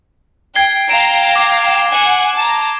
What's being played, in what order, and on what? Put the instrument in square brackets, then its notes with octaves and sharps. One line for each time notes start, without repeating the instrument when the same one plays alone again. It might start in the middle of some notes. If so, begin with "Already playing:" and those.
[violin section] G5 [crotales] G#6 C7 G7
[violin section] F5 G5 A#5 [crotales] D7 E7
[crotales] D6
[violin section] F#5 G#5
A5 A#5